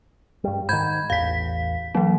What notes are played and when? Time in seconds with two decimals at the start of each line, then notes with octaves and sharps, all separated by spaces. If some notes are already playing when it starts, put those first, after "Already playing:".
0.44 G2 G3
0.69 G#2 D#3 B5 G6 G#6
1.10 A1 E2 F5 B6
1.95 E3 F#3 A#3